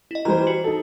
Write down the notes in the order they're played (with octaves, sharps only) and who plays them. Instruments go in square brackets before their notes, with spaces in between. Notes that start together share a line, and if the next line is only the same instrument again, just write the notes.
[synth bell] E4 D#5
[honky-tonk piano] E3 G3 C5 [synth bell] A#5
[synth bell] F#4
[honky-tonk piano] D#4 A4